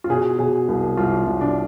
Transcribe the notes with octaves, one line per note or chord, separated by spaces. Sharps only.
F4
B2 G#4
B2 G#4
C2
C2 F4
C2
D4